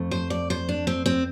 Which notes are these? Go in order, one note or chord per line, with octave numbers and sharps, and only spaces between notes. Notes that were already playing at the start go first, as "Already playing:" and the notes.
Already playing: F2 A3
C5
D5
C5
D4
C4
C4